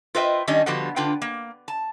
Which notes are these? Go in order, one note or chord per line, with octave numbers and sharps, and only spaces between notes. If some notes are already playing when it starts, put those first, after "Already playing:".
F4 B4 C5 D#5 E5 G5
D#3 G3 C#4 D4 D#5
D3 F3 G3 B3 F#4 G4
D3 D4 F4 B4 G5
A#3
A5